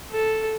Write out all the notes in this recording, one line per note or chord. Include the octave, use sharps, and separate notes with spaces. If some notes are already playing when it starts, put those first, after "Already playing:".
A4